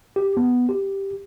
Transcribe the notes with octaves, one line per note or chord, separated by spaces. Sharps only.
G4
B3
G4